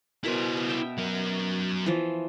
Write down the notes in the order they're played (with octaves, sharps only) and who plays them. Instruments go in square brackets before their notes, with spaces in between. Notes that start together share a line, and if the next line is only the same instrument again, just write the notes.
[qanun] B2 A#4 G#5 [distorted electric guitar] E4 C5
[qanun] B3
E5 G5
[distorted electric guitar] F#3 A#4
[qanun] E3 F3